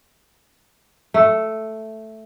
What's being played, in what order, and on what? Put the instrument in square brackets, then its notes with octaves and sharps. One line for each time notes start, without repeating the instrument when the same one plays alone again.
[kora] A3